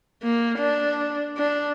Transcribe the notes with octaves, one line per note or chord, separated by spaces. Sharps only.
A#3
D4
D4